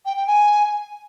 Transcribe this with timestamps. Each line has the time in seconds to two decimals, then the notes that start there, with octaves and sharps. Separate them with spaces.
0.06 G5
0.16 G5
0.27 G#5